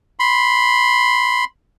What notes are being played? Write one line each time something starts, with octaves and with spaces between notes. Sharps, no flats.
B5 C6